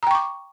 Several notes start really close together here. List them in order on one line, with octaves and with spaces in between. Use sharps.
A#5 G5 C#6 D6